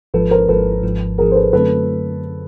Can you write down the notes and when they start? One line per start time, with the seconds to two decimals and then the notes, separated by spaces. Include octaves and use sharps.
0.14 G#1 G#2 F3 A4 B4
0.31 A#4 C5
0.48 G#1 G#2 F3 A4 B4
0.83 G#1 G#2 F3
1.18 G#1 G#2 F3 G#4 A#4
1.32 C5
1.35 A4 B4
1.53 F#2 D3 F#3 A3 C4 A4 B4